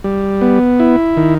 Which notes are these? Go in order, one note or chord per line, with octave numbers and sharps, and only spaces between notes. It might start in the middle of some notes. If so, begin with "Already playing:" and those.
G3
B3
E4
D#3